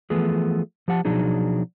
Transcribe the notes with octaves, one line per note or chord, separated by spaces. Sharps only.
E3 F3 A3 B3 G#4
F3 G4 F#5 A5
B2 F3 F#3 D4 D#4 G#4